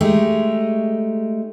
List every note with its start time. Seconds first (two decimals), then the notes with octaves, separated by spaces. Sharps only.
0.01 G#3 A3 D#4 G4